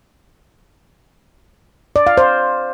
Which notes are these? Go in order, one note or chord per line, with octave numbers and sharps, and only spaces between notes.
D5
F5
C5